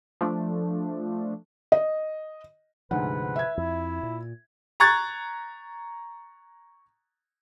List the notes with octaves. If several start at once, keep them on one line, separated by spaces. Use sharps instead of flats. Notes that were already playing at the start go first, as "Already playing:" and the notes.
F3 A3 D4
D#5
D2 G#2 C3 F3 B4 F#5
E5 G#6
F2 E4
A#2
A#5 C#6 F#6 G#6 A6